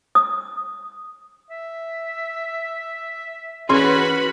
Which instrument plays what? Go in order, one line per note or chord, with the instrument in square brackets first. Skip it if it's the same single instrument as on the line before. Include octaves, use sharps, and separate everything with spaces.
[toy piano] D#6
[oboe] E5
[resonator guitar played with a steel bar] E3 C#4 G#4 [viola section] F#4 B4 B5 [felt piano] C6